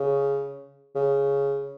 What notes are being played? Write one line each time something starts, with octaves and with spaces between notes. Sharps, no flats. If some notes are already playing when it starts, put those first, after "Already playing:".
Already playing: C#3
C#3